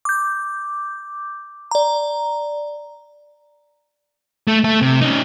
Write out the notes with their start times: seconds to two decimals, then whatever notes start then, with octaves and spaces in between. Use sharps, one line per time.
0.05 D6 G6
1.71 D5 A#5
4.48 A3
4.64 A3 A4
4.81 C3
5.01 C#4 D#4